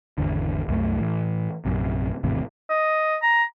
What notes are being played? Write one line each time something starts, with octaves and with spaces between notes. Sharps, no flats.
G#1 E2 D3
C2 F#2 A3
A2 E3
A#1 F#2 C3
G#1 E2 A2 C3
D#5
A#5